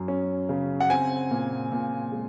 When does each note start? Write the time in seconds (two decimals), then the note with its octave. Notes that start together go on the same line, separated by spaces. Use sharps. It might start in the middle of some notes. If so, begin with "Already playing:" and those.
Already playing: F#2 F#3
0.08 C#4
0.49 C#3
0.80 F#5
0.90 C4 G#5
1.31 A#2
1.72 A#2
2.12 G#3